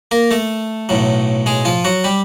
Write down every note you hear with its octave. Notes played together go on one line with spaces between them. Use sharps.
A#3 A#4
A3 A4
B1 A2 F#3
G#3 G#4
F3 F4
F#3 F#4
G3 G4